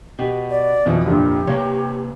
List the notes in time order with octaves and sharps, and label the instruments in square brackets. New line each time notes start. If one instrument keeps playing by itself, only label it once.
[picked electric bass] B2 [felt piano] G4
[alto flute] D5
[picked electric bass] F2 [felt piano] B2 E3 F3
[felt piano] C2 G2 A#2 [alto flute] G4
[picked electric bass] C3 A#3 [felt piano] C#5